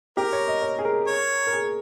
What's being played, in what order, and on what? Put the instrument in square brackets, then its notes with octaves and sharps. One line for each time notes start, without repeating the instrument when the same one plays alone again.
[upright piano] G4 [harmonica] A#4
[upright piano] C#5
D#5
C#5
G#4
A#4
[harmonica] C#5
[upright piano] A#4
G#4